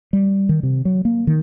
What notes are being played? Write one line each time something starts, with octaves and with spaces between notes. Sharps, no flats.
G3
D#3
C3
F#3
A#3
D#3